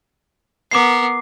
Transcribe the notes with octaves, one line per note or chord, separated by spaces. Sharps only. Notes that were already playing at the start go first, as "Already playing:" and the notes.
B3 A#4 D6 C7